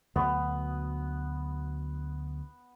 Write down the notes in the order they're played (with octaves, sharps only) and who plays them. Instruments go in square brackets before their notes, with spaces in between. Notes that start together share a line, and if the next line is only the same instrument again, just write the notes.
[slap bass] D2 B2 F#3 [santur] B3